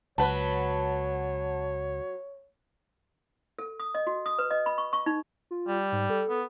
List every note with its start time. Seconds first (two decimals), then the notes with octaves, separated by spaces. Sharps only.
0.18 C#2 F#3 B4 C#5 F#5 A5
3.59 A4
3.80 D#6
3.95 D#5
4.07 F#4
4.26 D#6
4.39 B4
4.51 D#5
4.66 B5
4.78 C#6
4.93 C#6
5.06 D#4
5.51 F4
5.68 G3
5.92 G#2
6.10 A4
6.29 B3